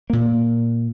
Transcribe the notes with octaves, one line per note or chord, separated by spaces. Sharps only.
A#2 A#3